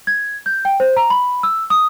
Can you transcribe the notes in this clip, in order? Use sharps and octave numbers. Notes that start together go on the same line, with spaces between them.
G#6
G6
G5
C5
A#5
B5
E6
D#6